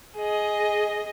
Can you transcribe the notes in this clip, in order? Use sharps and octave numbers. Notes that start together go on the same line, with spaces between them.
G#4 D#5